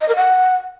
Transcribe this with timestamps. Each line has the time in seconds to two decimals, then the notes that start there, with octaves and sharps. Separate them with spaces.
0.01 D#5
0.09 A#4
0.16 F#5